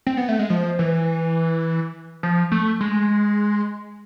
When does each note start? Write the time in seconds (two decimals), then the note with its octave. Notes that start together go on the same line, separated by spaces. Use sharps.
0.07 C4
0.17 B3
0.29 A3
0.39 G#3
0.50 F3
0.79 E3
2.23 F3
2.52 A3
2.81 G#3